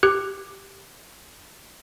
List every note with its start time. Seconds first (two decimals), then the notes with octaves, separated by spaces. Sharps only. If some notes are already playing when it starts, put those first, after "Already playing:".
0.03 G4 F#6